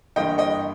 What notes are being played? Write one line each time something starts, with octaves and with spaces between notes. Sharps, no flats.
G1 G2 E3 A#3 D#5 G5
D#5 G5